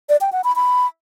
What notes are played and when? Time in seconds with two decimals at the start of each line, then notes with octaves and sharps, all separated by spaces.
0.09 D5
0.21 G5
0.32 F#5
0.44 B5
0.56 B5